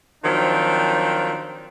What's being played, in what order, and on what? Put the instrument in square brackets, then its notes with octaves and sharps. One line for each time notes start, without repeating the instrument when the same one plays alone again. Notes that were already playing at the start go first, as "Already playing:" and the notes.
[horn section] D#3 F3 F#3 C4 D4